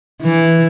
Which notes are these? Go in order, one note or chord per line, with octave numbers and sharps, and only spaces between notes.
E3